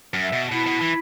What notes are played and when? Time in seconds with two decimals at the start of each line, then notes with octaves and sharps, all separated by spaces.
0.14 F#2
0.23 E5
0.33 B2
0.51 B2 E4
0.66 B2
0.81 E3